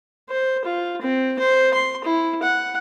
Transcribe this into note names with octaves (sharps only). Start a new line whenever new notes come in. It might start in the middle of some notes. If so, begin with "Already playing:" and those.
C5
F4
C4
C5
C6
E4
F#5